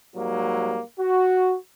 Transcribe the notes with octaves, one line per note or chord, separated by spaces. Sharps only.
G#2 F#3 G3 A#3
F#4